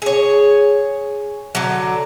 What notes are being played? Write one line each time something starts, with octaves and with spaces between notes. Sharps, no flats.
G#4 C#5
D3 F#3